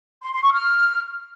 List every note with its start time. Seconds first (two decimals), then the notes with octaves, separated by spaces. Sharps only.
0.21 C6
0.31 C6
0.42 C#6
0.52 F6